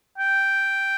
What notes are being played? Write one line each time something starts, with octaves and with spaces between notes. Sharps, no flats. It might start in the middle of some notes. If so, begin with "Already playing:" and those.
G5